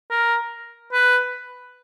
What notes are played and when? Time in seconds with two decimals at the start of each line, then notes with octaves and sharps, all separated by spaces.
0.10 A#4
0.93 B4